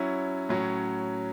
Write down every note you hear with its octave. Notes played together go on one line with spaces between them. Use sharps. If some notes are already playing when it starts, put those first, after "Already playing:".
Already playing: F#3 C#4 E4
A2 F#3 C#4